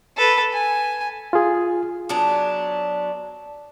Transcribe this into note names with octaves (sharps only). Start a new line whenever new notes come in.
A4 B4
G#5
F4 G#4
F#3 B3 D4